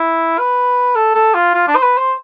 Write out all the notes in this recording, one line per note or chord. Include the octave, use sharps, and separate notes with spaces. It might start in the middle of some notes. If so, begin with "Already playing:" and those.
Already playing: E4
B4
A4
A4
F4
F4
D4
C5
B4
C5